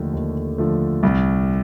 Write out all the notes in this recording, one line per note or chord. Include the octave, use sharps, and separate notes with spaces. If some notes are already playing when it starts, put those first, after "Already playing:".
Already playing: D#2 D3 F3 A3 G4
D#2
D3 F3 A3
C2